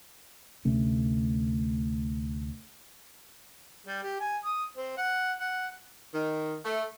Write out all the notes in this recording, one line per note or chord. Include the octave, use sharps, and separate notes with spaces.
D2 C3 A3 C#4
G3
G4
G#5
D#6
C4
F#5
F#5
D#3
A3